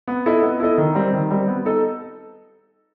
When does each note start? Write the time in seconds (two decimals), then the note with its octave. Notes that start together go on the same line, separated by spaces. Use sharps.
0.08 B3
0.26 E4 A4 D#5
0.42 B3
0.60 E4 A4 D#5
0.78 D#3
0.95 G3 C4
1.13 D#3
1.30 G3 C4
1.48 B3
1.65 D#4 A4 D#5